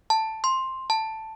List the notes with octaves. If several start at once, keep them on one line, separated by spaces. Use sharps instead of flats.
A5
C6
A5